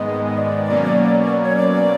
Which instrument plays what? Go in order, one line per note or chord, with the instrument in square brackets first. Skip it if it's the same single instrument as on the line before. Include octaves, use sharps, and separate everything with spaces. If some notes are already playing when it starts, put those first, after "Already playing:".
Already playing: [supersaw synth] G#2 D#3 G#3 B3 [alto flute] D#5
[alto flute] D5
[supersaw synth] B2 F#3 A#3 C#4
[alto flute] C#5
D5